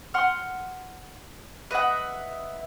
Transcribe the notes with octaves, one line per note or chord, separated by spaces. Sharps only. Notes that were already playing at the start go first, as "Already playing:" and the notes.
F#5 C6 F6
B4 D#5 E5 F#5